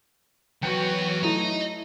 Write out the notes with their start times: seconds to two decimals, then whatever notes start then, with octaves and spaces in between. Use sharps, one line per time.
0.63 E2 F#3 F#4 B4 C#5 G5 C#7
1.24 A3 E4 D#5 A#5